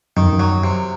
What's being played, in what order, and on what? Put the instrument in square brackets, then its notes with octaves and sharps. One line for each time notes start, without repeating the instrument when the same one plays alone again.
[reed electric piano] F#2 [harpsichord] D#3
[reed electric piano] F2
F#2
[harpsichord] F#3
C3